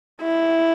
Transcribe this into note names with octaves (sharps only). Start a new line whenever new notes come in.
E4